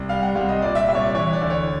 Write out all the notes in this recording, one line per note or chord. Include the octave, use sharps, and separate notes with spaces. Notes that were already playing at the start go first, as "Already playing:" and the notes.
Already playing: C2
G3 F5
F#5
C2 F5
D#5
A#2 D5
E5
C2 E5
C#5
D5
E3 C#5
D5
D2
C#5